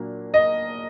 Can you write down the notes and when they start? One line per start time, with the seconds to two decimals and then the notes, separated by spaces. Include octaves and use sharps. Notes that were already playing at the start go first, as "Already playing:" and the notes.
Already playing: A#2 F#3 A#3 D4
0.34 D#5